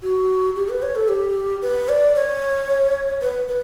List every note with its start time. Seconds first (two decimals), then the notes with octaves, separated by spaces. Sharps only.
0.02 F#4
0.56 G4
0.69 B4
0.82 C#5
0.95 A4
1.08 G4
1.62 B4
1.89 D5
2.15 C#5
3.21 B4
3.48 B4